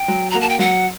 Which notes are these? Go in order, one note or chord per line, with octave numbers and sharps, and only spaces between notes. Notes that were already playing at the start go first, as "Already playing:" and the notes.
Already playing: G5
F#3
A#3 F#4 A#5
A5
G5
F#3 F#5